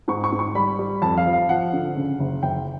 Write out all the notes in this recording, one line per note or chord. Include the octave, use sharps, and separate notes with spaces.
G#2 C#6
C#6
G#2
C#6
G3 B5
G3
F2 A5
F5
F3
F5
F3 F#5
D3
C#3
F#1
F#1 G5